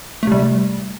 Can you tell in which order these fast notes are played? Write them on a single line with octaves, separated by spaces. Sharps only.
A3 C3 G3